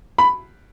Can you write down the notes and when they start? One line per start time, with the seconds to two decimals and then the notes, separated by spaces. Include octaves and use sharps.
0.18 B5